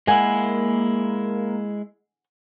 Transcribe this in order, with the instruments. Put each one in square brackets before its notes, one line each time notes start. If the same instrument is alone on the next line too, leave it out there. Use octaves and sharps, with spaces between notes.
[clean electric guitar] G#3 E4 [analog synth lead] A#3 [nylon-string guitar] F#5 G#5